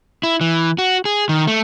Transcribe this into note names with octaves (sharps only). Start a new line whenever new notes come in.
E4
E3
F#4
G#4
D#3
A3